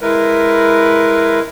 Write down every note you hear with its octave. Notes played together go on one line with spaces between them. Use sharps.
G#3 E4 A#4 B4